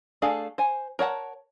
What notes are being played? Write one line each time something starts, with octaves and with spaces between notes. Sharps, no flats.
A3 D4 G#4 A4 F5
C5 G#5
A#4 C#5 F#5 A5